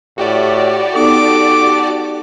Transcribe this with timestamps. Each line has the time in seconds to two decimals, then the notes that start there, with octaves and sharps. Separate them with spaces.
0.18 A2 F#4 G4 D5
0.95 B3 D#4 A4 D6